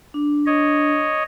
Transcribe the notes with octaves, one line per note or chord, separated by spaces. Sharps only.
D4
C#5 D#5